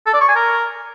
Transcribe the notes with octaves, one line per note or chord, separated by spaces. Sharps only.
A4
D5
C#6
G#5
A#4